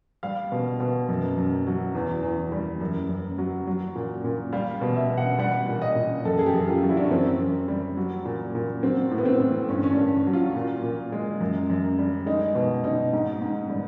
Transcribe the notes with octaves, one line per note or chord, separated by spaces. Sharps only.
G3 F5
B2
B2
F#2
F#2
F#3
E2
E2
G3
F#2
F#2
F#3
F#3
A#2
A#2
G3 F5
B2
E5
B2
F#5
G3 F#5
A#2
D#5
A#2
F#2 A4
G#4
G4
F#2
F4
F#3
E4
D4
C#4
F#2 C4
F#2
G3
F#3
A#2
A#2
F#3 C4
A2
B3
C4
A2
G2 C#4
C#4
D4
G2
F#3
F4
A#2
A#2
G#3
F#2
F#2
G3
G#3 D#4
B2
B2 D#4
G#2
G#2
G3